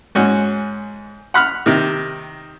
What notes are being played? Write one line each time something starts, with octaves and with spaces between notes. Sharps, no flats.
G#2 C#4 F#4
F#5 B5 F6
C3 D#3